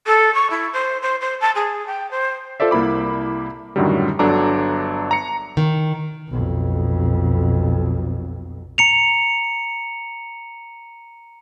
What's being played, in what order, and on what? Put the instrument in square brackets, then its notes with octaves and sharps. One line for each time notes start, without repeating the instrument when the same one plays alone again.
[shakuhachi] A4
C#6
E4
C5
C5
C5
A5
G#4
G5
C5
[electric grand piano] F4 A4 C5 D5 E5
C2 A#3 E4 B5 D6
F#2 A2 D3 D#3 F#3 G3
G1 F#3 D4 A4 A#5 D6
A#5 C#7
[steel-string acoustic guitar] D#3
[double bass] B1 F2
[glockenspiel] A#5 C#7 F7